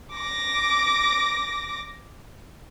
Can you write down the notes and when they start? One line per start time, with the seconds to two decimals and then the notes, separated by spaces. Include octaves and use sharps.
0.14 D6 A#6